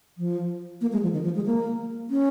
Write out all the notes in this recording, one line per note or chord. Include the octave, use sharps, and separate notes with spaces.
F3
A#3
G#3
F3
D#3
F3
G#3
A#3
C#4